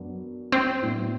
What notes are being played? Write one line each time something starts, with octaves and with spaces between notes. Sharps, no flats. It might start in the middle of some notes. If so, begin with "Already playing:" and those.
Already playing: F#2 F#3 B3 D4 F#4
C4
A2 F#3 B3 D4